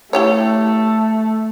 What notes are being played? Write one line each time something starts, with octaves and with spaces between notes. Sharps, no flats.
A3 E4 G4 C#5